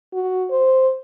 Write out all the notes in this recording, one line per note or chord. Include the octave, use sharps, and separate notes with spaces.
F#4
C5